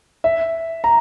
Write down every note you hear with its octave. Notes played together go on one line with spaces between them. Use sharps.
E5
A#5